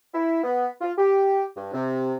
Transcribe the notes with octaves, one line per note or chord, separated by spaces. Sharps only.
E4
B3
F4
G4
G2
C3